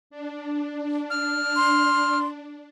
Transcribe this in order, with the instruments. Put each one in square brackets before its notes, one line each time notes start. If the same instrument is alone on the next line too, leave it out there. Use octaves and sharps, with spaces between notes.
[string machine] D4
[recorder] F6
[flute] C6